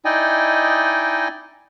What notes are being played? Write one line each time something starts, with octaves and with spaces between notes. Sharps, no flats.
D#4 E4 D5 D#5 G5 G#5